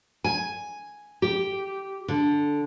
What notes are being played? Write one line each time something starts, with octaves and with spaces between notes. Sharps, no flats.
G#5
G4
D3